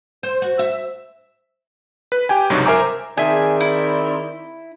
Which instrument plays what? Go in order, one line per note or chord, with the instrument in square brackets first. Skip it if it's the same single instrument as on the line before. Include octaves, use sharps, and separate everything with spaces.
[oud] C5
F#4
E5
[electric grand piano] B4
G4 G5 G#5
C#2 G2 C3 F#3 D#4 F#4
A#4 C5 E5 G#5 A#5 D6
[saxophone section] D#3 C4 D5 [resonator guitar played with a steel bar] G#4 E5 [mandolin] G#5
[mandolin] E4